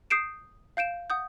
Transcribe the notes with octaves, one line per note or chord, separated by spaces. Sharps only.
D#6 G6 C7 D7 E7
F5 G6 D7 E7
F#5 D#6 G6